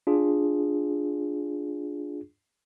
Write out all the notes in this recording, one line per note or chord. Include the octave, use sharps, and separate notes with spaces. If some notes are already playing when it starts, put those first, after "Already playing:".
D4 F4 G#4